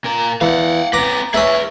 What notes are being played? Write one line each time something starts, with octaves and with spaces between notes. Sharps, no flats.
A#2 A#4
E2 F5 F#5
C4 B4 A#5 D6
C#4 E4 G#4 B4